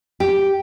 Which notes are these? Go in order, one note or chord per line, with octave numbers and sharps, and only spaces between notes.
G4